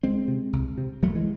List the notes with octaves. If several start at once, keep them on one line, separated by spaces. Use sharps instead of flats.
C2 G#3 C4
C3
C2
C3
E1 F#3 A3
E3 G#3